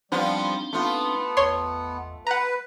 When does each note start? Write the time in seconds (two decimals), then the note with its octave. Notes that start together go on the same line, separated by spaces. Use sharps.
0.12 F3 G3 B3 C4 D4 D#4 F4
0.73 A3 B3 F4
1.37 G#1 E2 C#5 C6
2.27 B4 F#5 A#5